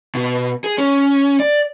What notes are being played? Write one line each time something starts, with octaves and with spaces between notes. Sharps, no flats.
B2
G#4
C#4
D5